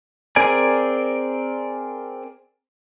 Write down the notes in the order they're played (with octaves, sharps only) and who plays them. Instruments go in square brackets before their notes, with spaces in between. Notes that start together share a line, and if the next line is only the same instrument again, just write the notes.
[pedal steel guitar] C4 G#4 A#4 D5 G#5